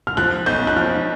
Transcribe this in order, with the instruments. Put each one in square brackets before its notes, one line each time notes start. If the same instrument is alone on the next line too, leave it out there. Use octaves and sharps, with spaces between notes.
[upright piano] F6
[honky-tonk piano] F3 [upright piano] F#6
[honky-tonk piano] B1 [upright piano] G6
[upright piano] F#6
[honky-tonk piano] F3 [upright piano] F6